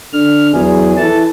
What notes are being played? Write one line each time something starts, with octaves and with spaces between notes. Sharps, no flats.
D3 F6
E2 F#3 G#4
E3 A4 A5